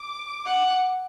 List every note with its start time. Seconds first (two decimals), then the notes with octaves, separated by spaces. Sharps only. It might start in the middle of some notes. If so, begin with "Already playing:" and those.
Already playing: D6
0.46 F#5